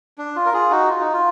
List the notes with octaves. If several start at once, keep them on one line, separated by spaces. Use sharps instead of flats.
D4
F4
A#4
F4 G#4
D#4 F#4
F4
D#4
F4